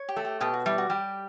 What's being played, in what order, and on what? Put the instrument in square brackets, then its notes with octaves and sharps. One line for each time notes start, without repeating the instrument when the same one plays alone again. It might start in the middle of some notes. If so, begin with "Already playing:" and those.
Already playing: [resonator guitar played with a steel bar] C#5
[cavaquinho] G4
[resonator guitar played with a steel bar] A3
[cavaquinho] G4
[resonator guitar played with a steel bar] B2 [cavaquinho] G4
[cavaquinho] F#4
[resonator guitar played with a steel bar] G3 [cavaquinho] E4
[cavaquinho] F#4
[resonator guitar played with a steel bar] G3 [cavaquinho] G4